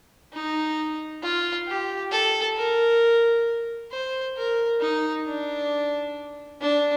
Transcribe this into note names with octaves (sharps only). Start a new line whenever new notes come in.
D#4
F4
G4
A4
A#4
C5
A#4
D#4
D4
D4